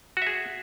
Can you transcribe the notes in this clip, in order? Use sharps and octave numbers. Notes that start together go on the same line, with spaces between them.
F#4 G#4 E5